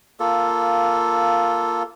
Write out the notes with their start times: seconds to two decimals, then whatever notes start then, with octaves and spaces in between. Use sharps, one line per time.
0.20 A#3 F4 A4